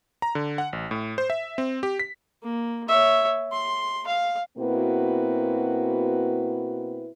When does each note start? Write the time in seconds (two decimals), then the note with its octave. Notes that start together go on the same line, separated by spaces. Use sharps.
0.22 A#5
0.35 D3
0.58 F#5
0.73 A1
0.91 A2
1.18 C5
1.30 E5
1.58 C4
1.83 G4
1.99 B6
2.42 A#3
2.88 C#5 E5
3.52 C6
4.07 F5
4.58 B2 A#3 C4 E4 F#4 B4